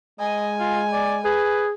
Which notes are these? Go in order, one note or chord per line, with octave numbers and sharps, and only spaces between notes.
G#3 D#5 G#5
F4
D5
G#4 B4